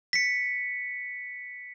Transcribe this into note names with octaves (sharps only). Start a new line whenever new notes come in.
B6 C#7